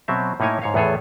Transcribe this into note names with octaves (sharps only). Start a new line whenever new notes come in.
B2 F#3 C4 E5
A2 A#3 D#4 E4 C#5 G#5
G#2 C#5 F5
E2 A2 B3 G#4 A4 C#5